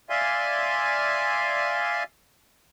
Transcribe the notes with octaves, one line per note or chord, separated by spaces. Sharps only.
D5 E5 F5 G#5 C6